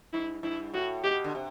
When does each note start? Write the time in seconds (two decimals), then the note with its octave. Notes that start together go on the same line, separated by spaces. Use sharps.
0.13 G2 E4
0.43 G2 E4
0.74 A2 F#4
1.04 B2 G4
1.24 D3
1.35 C3